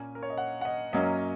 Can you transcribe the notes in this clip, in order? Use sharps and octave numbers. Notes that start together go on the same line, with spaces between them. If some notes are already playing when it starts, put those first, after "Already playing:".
Already playing: A#2 A#3 C#4 G#5
A#4
C#5
D#5
F#5
F#5
D#5
F#2 F#3 A#3 C#4 D#5